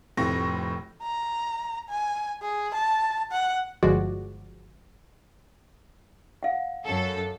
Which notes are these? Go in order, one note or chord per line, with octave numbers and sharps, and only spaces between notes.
F1 A2 C4 C#6 A#6
A#5
G#5
G#4
A5
F#5
G1 F3 G#3 F#4 D5
F5 F#5
F#2 A4